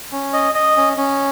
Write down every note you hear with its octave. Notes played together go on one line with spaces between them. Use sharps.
C#4
D#5
D#5
C#4
C#4